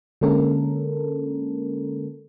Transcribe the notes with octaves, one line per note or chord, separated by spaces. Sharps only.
D3 G#3 A#3 C#4 A4 A#4